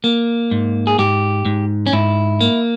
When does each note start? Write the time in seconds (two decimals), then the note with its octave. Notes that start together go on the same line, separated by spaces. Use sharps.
0.04 A#3
0.51 G#2
0.87 G#4
0.99 G#2 G4
1.45 G#2
1.87 C#4
1.93 G#2 E4
2.41 A#3